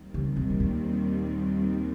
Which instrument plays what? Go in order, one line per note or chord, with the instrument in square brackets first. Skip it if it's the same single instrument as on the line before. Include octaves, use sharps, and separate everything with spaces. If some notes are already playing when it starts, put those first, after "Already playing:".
Already playing: [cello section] D#2 D#3 G3 C4
[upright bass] C#3
C3
C3
A#2